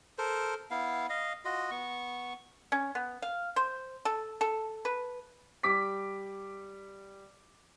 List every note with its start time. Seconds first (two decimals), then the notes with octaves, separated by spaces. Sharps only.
0.18 A4 A#4 C5
0.71 B3 E4 F5
1.09 D#5 F5
1.45 F4 F#4 D#5
1.71 B3 C#6
2.72 C#4
2.95 B3
3.22 F5
3.56 C5
4.05 A4
4.41 A4
4.85 B4
5.63 G3 D6 B6